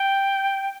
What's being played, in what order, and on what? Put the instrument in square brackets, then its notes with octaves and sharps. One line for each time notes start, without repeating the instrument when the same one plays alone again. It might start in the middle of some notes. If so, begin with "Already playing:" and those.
Already playing: [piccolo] G5